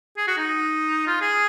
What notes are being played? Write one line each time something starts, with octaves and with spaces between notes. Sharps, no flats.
G#4
F#4
D#4
F4
G#4